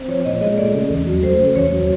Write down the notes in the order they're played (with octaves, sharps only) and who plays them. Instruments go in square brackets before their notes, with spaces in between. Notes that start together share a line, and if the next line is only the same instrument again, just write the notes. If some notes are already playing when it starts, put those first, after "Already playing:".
Already playing: [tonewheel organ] C4
[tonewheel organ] F3 [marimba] C#5
[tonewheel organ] A#2 [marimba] D#5
[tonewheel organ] G#3 [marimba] D#5
[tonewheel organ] A3 [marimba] D5
[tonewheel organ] C#3
E2
F#3
[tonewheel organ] A3 [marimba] C5
[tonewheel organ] C#3 [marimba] C5
[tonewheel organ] E2 [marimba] C#5
[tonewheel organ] F#3